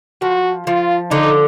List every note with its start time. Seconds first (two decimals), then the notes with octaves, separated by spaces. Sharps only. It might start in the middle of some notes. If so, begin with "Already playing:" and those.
0.22 F3 F#4
0.67 F3 F4
1.11 D3 D#4